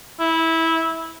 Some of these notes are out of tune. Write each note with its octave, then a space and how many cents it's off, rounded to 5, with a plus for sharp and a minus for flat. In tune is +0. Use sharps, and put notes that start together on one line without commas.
E4 -15